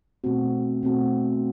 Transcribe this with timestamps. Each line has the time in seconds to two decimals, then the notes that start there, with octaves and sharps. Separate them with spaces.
0.24 B2 A3 C4 F#4
0.83 B2 A3 C4 F#4